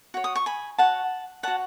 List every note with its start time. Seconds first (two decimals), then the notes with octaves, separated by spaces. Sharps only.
0.14 F#4 C#5
0.24 D#6
0.36 C#6
0.46 G#5 B5
0.78 F#4 C#5 F#5 A5
1.43 F#4 C#5 F#5 A5